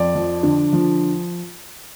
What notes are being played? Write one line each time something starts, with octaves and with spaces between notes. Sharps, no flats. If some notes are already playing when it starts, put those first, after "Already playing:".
Already playing: F2 D5
F3
D3
F3